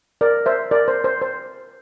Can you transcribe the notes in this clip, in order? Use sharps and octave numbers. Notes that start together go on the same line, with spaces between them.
A#4 D5
C5 E5
A#4 D5
C5
C5
C5